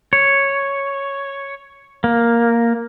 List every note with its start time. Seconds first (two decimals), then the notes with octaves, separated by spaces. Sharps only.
0.13 C#5
2.04 A#3